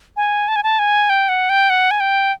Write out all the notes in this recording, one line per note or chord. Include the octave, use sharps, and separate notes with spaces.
G#5
A5
G#5
A5
G#5
G5
F#5
G5
F#5
G#5
G5